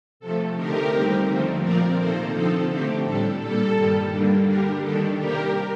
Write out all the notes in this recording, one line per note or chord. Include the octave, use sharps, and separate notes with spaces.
C3 F3 A3 A4
D3 A3 C4 D#4 G4 A#4
D#2 D#3 G3 C4
D#2 D3 F3 A3 C4
A#2 F3 C4 A#4 D5
C3 D#3 A#3 A4 C5
D3 F3 C4 D#4 A4
D3 A3 C4 G4
A2 G3 D4 A4
A#2 G3 A#3 A4
G2 D#3 G3
D3 G3 A#3 D4
D3 G3 D4 G4 A#4
D#2 D#3 G3 D4 A4
C3 G3 A#3 G4 A#4